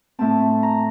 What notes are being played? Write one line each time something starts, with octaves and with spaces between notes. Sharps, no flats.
A2 A3 C4 A5
A#5